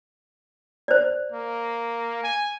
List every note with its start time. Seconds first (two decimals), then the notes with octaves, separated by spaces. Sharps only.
0.88 C5 D5
1.32 A#3
2.24 G#5